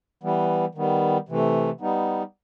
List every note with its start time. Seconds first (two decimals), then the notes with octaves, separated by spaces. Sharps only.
0.23 E3 G3 B3
0.75 D#3 G3 B3
1.29 C3 E3 A3
1.80 G3 B3 D#4